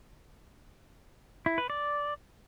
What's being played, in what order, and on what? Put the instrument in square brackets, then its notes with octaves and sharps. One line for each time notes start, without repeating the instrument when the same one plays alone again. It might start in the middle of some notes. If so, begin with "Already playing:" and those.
[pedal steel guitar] E4
B4
D5